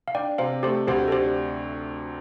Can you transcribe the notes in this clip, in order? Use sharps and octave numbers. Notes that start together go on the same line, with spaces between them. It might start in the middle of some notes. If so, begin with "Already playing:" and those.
F5
D4 D5 G5
C3 C5 F5
A3 G4 C5
D2 G4 C5
A4
D4 G4 C5